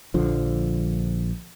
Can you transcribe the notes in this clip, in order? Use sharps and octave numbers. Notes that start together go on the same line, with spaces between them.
A#1 D3 F3